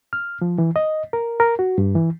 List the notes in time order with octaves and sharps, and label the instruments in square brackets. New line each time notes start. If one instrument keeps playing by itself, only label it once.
[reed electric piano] F6
F3
E3
D#5
A#4
A#4
F#4
G2
E3